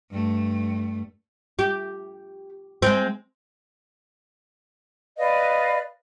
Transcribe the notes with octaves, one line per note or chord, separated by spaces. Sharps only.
G2 A3
G4
G#3 C4
B4 D5 D#5 F5